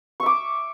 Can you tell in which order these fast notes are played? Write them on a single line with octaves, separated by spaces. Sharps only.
C#6 E5 D6